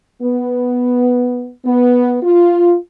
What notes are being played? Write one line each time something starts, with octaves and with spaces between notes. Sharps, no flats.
B3
B3
F4